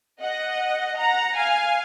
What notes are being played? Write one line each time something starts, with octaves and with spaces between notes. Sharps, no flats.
D#5 F#5
F#5 A#5
F5 G#5